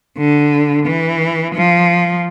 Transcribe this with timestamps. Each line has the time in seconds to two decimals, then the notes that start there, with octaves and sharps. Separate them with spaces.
0.17 D3
0.86 E3
1.54 F3